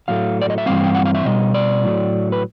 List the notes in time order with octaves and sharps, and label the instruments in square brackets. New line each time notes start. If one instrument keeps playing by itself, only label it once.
[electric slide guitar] A2 F#3 A3 F5
D5
D#5
E5
G2 E3 G3 C4 F5
G5
F#5
F5
E5
B2 G3 D#5
D5
A2 F#3 A3
B4